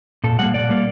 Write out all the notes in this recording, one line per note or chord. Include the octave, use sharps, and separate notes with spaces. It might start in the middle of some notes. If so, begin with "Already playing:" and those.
A#2 A4
G3 A#3 F#5
A#2 D5
G3 A#3